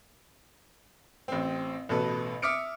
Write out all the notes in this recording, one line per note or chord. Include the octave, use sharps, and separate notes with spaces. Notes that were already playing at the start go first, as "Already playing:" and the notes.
A1 C4
A1 B2 A4 B4
E5 D6 D#6 F6 C#7 D7